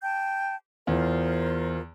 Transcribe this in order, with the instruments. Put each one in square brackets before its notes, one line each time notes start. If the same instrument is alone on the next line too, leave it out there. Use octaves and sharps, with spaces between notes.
[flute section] G5 A5 G6
[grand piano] E2 [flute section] F4 A#4 C5